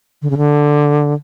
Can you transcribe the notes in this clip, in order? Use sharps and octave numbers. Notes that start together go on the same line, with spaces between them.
D3
C#3
D3